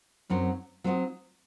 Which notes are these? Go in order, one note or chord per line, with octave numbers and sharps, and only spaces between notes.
F#2 F#3 C4 D#4 F#4
F#3 C4 D#4 F#4